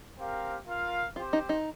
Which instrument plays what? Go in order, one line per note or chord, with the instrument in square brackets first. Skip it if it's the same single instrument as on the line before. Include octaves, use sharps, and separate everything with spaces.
[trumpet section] C4 G4 A#4 F5
F4 A#4 F5
[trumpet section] C4 G4 C5 [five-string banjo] F4
[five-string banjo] D#4
D#4